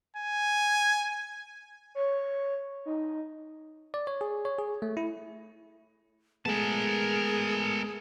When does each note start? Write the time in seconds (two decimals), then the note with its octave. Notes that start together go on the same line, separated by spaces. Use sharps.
0.16 G#5
1.95 C#5
2.86 D#4
3.94 D5
4.07 C#5
4.21 G#4
4.45 C#5
4.58 G#4
4.82 A3
4.97 E4
6.46 G#3 A3 B3 G#4 A#4 A5